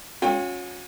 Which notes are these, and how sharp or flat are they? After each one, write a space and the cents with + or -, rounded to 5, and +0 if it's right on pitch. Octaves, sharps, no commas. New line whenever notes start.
C#4 +0 F#4 -45 G5 +35